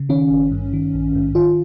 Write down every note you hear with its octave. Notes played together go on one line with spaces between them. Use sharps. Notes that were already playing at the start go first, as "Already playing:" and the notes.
Already playing: C#3
D#3 C#4
G#1
G2
D#3
A#1
G#2
D#3 F4